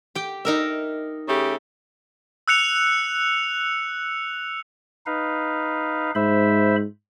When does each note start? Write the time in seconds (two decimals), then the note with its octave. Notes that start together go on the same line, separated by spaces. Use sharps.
0.15 G4 G5
0.45 D#4 A#4 E5
1.28 C#3 A3 G4
2.48 E6 F#6 C#7 F7
5.06 D#4 B4 F5
6.15 G#2 C5 E5 B5